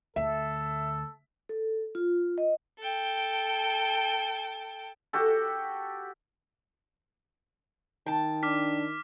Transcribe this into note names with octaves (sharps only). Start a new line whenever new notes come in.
D2 A4 E5
A4
F4
D#5
A4 G5
F#4 G4 A4
D#3 G5 A5
D4 D6 F6 B6